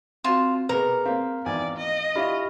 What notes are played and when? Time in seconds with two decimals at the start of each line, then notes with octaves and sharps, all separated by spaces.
0.24 C4 F4 F#4 A5
0.69 B2 A#3 B3 G#4 A#4 B4
1.06 A#3 C4 F5
1.46 G#1 E2 D5 G#5
1.77 D#5
2.15 D4 E4 F4 G4 B5 F6